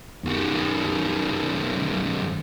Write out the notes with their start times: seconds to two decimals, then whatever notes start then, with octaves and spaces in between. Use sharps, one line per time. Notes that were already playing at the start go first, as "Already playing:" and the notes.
0.24 F#2 D#3